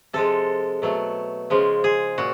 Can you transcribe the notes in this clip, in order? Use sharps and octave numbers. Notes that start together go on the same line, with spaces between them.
C3 F3 G#3 A4
B2 F#3 A3
C#3 F3 G#3
G#4
A#2 F#4